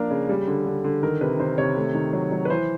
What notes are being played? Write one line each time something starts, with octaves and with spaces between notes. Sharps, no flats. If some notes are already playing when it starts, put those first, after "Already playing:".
Already playing: F3 A#3 D4 A#4
C#3
G3
D3
D3
D3
D#3 A#4
C3 B4
D#3 C5
C3 C#5
A3
D#3
F#3
F#3
B4
E3 C5